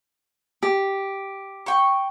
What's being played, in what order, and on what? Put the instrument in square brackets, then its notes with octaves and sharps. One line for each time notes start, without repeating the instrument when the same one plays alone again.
[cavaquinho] G4
[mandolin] G5 C#6